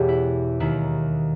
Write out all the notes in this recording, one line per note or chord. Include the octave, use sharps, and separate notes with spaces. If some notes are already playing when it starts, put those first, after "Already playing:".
Already playing: E2 B2 G#3 B3 G4 C#5 E5
E4
D#2 D#3 A#3 E4